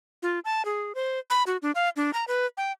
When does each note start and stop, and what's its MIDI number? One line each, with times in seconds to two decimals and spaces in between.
0.23 0.39 65
0.45 0.65 81
0.65 0.93 68
0.95 1.19 72
1.30 1.43 83
1.47 1.57 66
1.62 1.71 62
1.75 1.89 77
1.96 2.11 62
2.13 2.24 82
2.28 2.46 71
2.57 2.72 79